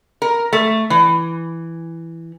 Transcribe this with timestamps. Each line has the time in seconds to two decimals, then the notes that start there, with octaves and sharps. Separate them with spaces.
0.22 A#4
0.53 A3
0.90 E3